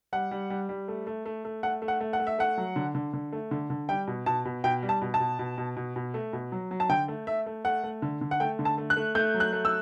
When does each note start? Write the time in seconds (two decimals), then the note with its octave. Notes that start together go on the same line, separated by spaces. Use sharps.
0.13 G3 F#5
0.31 G3
0.50 G3
0.69 G3
0.88 A3
1.07 A3
1.26 A3
1.45 A3
1.63 A3 F#5
1.82 A3
1.88 F#5
2.00 A3
2.13 F#5
2.19 A3
2.27 E5
2.38 A3 F#5
2.57 F#3
2.76 D3
2.95 D3
3.13 D3
3.32 A3
3.51 D3
3.70 D3
3.89 G3 G5
4.07 B2
4.26 B2 A5
4.45 B2
4.64 B2 G5
4.83 G3
4.89 A5
5.02 B2
5.14 A5
5.20 B2
5.39 B2
5.58 B2
5.76 B2
5.96 B2
6.14 A3
6.33 B2
6.52 F#3
6.71 F#3
6.80 A5
6.89 D3 G5
7.08 A3
7.27 A3 E5
7.46 A3
7.65 A3 F#5
7.84 A3
8.02 D3
8.21 D3
8.31 F#5
8.40 A3 G5
8.59 D3
8.65 A5
8.78 A3
8.90 F#6
8.96 A3
9.15 A3 G6
9.34 F#3
9.40 F#6
9.53 A3
9.65 E6